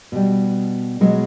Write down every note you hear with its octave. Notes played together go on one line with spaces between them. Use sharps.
B2 G3
B2 F#3 G#3